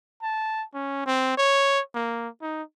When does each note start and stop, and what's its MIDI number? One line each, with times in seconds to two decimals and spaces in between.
0.22 0.64 81
0.74 1.02 61
1.06 1.33 60
1.37 1.81 73
1.95 2.28 58
2.42 2.63 63